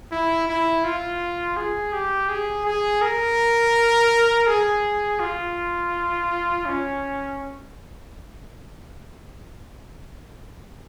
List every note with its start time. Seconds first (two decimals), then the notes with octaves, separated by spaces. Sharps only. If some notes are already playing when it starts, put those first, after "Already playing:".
0.11 E4
0.47 E4
0.84 F4
1.56 G#4
1.93 G4
2.29 G#4
2.65 G#4
3.02 A#4
4.47 G#4
5.20 F4
6.66 C#4